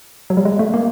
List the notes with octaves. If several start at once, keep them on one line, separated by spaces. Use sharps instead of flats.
F#3
G3
G#3
A3
A#3